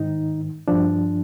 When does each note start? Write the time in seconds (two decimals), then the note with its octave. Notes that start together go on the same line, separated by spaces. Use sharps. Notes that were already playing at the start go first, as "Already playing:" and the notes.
Already playing: G#2 D#3 D#4
0.68 G2 F3 D4